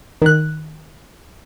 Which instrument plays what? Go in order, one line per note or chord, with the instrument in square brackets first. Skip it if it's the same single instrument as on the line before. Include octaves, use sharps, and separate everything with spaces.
[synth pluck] D#3 F#6